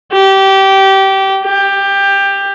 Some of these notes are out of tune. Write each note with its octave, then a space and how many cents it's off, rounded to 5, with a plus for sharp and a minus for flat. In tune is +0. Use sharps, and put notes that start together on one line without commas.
G4 -20
G4 +15